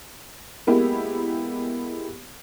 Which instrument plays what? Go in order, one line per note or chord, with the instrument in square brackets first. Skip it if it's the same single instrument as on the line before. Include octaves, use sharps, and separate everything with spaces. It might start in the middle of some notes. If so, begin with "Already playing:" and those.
[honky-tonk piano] G#3 A#3 B3 E4 G4